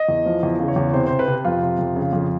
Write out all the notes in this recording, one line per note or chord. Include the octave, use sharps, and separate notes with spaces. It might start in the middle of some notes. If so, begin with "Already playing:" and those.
Already playing: D#5
E2
F3
E2
C#3
C#5
E2
C3 C5
C3 C5
B4
C3
F2 F4
C3
F2
C#3
F2